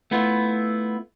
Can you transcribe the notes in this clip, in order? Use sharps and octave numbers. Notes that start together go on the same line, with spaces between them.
A3 B3 E4 F4